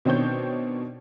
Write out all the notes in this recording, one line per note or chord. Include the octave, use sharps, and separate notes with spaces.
B2 D#3 C4 D4 C#5 G6